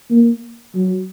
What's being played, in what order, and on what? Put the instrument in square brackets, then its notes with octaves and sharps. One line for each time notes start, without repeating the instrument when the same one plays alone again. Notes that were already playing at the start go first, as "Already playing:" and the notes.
[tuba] A#3
F#3